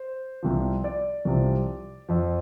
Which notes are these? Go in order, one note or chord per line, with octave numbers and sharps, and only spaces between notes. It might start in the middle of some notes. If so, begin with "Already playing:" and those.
Already playing: C5
C2 C3 F3
D5
C2 C3 F3
F2 F3